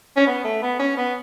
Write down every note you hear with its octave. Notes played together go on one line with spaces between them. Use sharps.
C#4
B3
A3
B3
C#4
B3